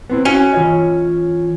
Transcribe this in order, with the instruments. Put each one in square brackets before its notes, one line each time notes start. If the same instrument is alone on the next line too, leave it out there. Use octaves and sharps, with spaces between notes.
[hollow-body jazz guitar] B3 C4 E4
[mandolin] C#4 [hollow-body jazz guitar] F#4
[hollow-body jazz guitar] E3 C#5 D#5 [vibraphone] F4